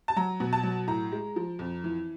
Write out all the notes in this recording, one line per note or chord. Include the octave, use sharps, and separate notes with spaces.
A5
F#3 A#5
B2
A5
F#3
A2 A#5
G#3
F3
F2
E3